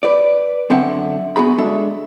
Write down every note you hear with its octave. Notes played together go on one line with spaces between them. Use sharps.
B4 D5
F#2 D3 C4 E5 F#5
B3 F#4 G#4 B5
G#3 D4 A4 E5